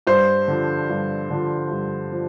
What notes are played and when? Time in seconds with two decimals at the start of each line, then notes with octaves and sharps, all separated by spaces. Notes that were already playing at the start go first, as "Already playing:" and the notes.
0.07 G2 C5
0.48 D3 F3
0.90 G2
1.30 D3 F3
1.71 G2
2.12 F3